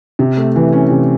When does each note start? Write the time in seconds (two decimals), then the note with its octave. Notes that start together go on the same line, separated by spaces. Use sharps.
0.19 C3
0.37 A3
0.56 E3
0.72 C#4
0.90 C3